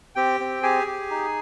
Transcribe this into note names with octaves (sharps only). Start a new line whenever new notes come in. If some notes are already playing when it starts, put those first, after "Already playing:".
C4 G4 G5
C4
G4 G#4 G#5
G4
D#4